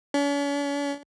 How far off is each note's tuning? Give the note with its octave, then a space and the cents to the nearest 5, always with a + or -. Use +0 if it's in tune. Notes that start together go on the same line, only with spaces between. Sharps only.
C#4 +45